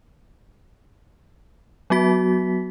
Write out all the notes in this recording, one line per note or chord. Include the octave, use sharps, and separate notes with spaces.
F#3 B3 F#4 B6